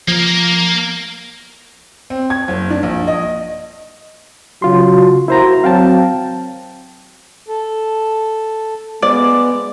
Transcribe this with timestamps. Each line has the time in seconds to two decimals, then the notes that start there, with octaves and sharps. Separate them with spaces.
0.08 F3 A#3 A#4
2.10 C4
2.30 G#6
2.48 F#1
2.70 D4
2.83 A#1
3.08 D#5
4.62 C#3 F#3 F4 F#4 C6
5.28 A#3 E4 F#4 C5 A#5
5.64 F#3 C4 F5 G5 A5
7.48 A4
9.02 G#3 B3 D5